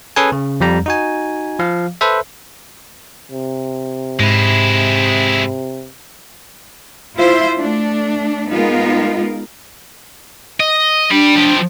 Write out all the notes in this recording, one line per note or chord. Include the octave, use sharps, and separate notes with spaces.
C#4 G#4 A4 B4 G#5
C#3
F2 G3 A#5
D#4 F#4 G#5
F3 F5
A4 B4 C5 E5
C3
G#2 G#3 E4
E4 F4 C5 E5
A3 D4
G#3 B3 D#4 F4 A#4
D#5
G3 D4
F3 G4